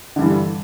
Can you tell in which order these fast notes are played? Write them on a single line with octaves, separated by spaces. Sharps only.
D3 G2 E3 G3